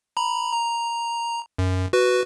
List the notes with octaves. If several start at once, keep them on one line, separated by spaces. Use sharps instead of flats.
A#5 B5
A#5
F#2
F#4 B4